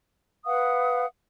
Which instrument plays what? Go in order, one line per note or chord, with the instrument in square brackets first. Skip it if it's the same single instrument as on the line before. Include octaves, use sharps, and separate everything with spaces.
[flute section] B4 F5 F#5 D#6